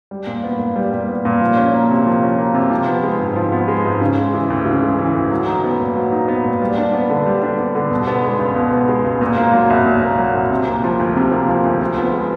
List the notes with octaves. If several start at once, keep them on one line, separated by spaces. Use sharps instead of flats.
G3
A#2
B3
A#2
G3
A#2
B3
A#2
F3
C#4
A#3
C3
F3
C#4
A#3
C3
F3
B3
G#3
G#2
F3
B3
G#3
G#2
C#3
G#3
E3
D2
C#3
G#3
E3
D2
F#3
D#4
B3
A#2
F#3
D#4
B3
A#2
G3
D4
B3
D3
G3
D4
B3
D3
B2
B3
G#3
C#2
B2
B3
G#3
C#2
A#2
A#3
F#3
C2
A#2
A#3
F#3
C2
C3
A#3
F3
D2
C3
A#3
F3
D2
F3
B3
G#3